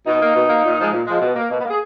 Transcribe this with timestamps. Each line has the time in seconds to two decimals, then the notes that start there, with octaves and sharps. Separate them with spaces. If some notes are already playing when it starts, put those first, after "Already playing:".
0.07 B2 D#4
0.21 A#3
0.35 B2
0.49 A#3
0.64 A#2
0.79 F3 G#3
0.92 A#2
1.07 F3 G#3
1.21 B2
1.36 A#3
1.51 B2
1.59 B3
1.65 A#3
1.70 G#4